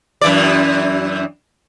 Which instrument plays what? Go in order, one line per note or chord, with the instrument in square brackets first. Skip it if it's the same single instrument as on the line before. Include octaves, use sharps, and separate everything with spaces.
[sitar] F#2 E3 D5